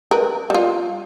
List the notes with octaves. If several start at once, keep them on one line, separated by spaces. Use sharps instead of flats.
A#4 B4
G3 F4